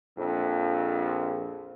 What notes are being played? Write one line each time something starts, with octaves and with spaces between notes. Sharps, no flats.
A#1 F2